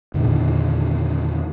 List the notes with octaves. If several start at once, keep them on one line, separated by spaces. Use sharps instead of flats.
E2 A#2 D3 D#3